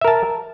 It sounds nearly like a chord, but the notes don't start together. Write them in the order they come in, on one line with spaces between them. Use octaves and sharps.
E5 A#4 A5